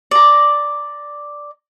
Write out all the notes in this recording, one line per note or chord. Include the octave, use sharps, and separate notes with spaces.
D5 A#5